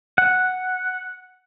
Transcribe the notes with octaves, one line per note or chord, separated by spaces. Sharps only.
F#5